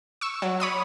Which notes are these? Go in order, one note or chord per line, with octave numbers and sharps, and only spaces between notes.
C#6 E6
F#3
C#5 B5 D#6